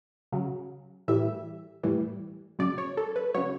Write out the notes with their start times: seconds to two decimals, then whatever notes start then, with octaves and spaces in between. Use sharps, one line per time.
0.32 C#3 F#3
1.08 A2 E3 G3 E5
1.83 A2 E3 G3
2.59 C#3 F#3 D5
2.78 C#5
2.97 A4
3.16 B4
3.34 C#3 F#3 C#5